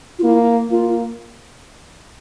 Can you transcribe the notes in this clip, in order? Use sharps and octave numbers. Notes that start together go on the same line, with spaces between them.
F4
A#3 E4
A#3 F4